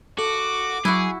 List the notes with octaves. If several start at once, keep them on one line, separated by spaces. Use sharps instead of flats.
F#4 A4 D6
F#3 E4 F#4 G#4